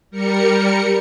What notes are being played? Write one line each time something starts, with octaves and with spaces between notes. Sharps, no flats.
G3 A#4 C#7